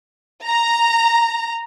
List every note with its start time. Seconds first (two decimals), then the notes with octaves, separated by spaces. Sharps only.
0.46 A#5